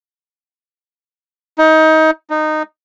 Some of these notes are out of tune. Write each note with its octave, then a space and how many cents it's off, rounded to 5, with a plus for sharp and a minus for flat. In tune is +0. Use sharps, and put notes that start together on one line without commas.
D#4 +25
D#4 -15